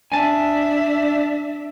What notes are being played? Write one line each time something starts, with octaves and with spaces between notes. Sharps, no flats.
D4 E5 G#5 A5